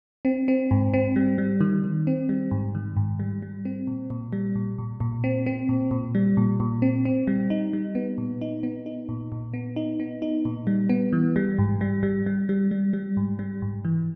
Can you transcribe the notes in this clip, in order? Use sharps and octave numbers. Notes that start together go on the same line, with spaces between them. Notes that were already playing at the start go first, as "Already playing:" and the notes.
C4
C4
G#2
C4
G3
G3
D#3
D#3
C4
G3
G#2
D#3
G#2
G3
G3
C4
A#2
A#2
G3
A#2
A#2
A#2
C4
C4
A#2
A#2
G3
A#2
A#2
C4
C4
G3
D#4
G3
B3
A#2
D#4
B3
D#4
A#2
A#2
B3
D#4
B3
D#4
A#2
G3
B3
E3
G3
G#2
G3
G3
G3
G3
G3
G3
G#2
G3
G#2
E3